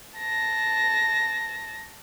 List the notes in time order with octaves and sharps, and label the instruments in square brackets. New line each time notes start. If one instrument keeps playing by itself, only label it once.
[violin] A5 A#6